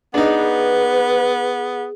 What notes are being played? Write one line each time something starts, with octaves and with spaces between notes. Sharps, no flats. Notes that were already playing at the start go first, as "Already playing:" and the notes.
B3 D4 D#4 G#4 B4